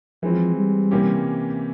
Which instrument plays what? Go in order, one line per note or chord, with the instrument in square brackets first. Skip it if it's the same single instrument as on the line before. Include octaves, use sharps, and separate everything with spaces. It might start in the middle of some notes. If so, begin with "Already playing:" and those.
[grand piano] E3 G#3 C4 [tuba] F3
[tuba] G3
[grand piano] C3 E3 A#3 C#4 G4